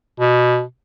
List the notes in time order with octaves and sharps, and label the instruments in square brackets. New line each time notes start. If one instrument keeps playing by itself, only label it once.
[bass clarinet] B2